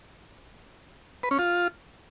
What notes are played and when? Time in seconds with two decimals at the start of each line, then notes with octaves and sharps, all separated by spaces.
1.23 B4
1.31 C#4
1.39 F4